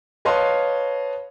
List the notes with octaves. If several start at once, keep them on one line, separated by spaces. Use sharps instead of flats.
B4 C#5 D#5 F5 A5 C6